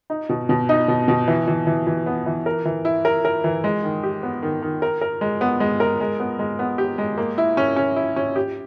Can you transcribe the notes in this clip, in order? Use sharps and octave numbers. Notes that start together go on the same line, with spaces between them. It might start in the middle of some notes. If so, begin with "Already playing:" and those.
D#4
B2
B2
D#4
B2
B2
E3
E3
E3
E3
B3
E3
A#4
E3
E4
A#4
A#4
E3
G#3
D#3
G4
B3
D#3
D#3
A#4
A#4
G#3
B3
G#3
A#4
G#3
B3
G#3
B3
G4
G#3
A#3
E4
C#4
C#4
E4
C#4
G4